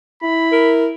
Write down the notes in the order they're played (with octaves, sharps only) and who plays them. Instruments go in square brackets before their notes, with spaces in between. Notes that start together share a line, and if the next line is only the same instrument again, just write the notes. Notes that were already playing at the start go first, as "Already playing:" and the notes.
[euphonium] E4 [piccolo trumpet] B5
[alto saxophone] A#4